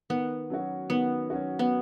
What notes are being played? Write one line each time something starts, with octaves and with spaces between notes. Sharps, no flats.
D#3 B3
F#3 C#4 F#4
D#3 B3
F#3 C#4 F#4
B3